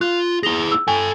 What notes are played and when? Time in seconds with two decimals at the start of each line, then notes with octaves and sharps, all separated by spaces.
0.01 F4 F#6
0.43 E4 G#4 A#6 F7 G7
0.72 E6
0.88 A4 G5 G#5